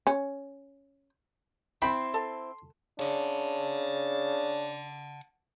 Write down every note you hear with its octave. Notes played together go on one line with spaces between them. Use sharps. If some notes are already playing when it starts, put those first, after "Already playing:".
C#4
C4 E4 G5 B5 C6
A4
C#3 D4 F#5 A5